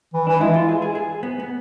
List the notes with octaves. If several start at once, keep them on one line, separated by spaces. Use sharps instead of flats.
E3
E3 D4
G#3 E4
F4
G#4
G#4
G#4
B3
B3